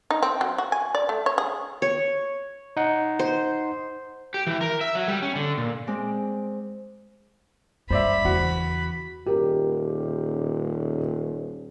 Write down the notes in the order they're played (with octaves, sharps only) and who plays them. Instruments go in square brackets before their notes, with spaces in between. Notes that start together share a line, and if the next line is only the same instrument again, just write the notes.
[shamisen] D#4
C4
F#3
F#4
G#5
D5
A3
C#5
G#4
[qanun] C#5
[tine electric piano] D#4 F#5
[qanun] C5
[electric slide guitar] G4
E3
A#4
E5
F#3
G3
C#4
D3
A#2
[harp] G#3 C4 D5
[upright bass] G2 [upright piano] C5 D5 E5 [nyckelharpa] B5
[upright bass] E2 C#3 [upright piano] F#4
[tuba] D#1 [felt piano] G4 A#4